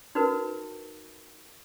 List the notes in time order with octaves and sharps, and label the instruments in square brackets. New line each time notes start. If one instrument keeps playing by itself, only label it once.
[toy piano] D#4 F#4 A#4 B4